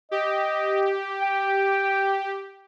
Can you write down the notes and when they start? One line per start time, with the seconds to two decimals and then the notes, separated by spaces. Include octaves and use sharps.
0.11 G4 D#5
1.22 G5